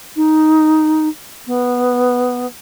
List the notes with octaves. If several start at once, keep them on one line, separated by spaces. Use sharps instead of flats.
D#4
B3